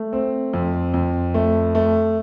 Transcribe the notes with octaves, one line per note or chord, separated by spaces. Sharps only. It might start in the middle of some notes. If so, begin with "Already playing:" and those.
Already playing: A3
C4
F2
F2
A3
A3